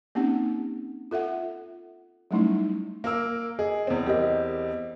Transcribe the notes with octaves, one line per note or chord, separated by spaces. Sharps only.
A#3 C4 C#4 D#4 G4 F#5
F4 A4 E5 F#5
F#3 G3 A3 C#4 D#4 E4
A#3 A#4 E6
G#4 D#5
E2 C4
G4 A#4 D#5